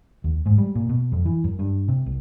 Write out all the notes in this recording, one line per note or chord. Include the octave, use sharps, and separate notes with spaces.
D#2
G#2
G3
A#2
B2
F2
E3
F#2
G2
C3
C2